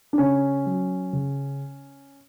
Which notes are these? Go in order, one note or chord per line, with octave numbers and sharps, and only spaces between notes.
D4
C#3 C#4
F#3
C#3